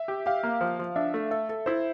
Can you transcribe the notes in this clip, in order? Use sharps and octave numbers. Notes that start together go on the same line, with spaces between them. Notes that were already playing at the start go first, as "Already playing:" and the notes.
Already playing: E5
G4
G4 F5
A#3
F3
F3
D4 E5
A3
A4 E5
A4
E4 C5